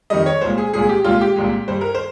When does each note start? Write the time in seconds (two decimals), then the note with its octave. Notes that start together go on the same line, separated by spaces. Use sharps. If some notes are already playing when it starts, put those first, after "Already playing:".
0.10 F2 D#3 G3 D#5
0.26 C#5
0.41 C2 A#2 G#3 C5
0.58 G#4
0.73 C2 A#2 G#3 G#4
0.89 G4
1.04 C2 A#2 G#3 F4
1.21 G4
1.36 C2 A#2 G#3
1.68 G2 G3 C5
1.81 A#4
1.95 C5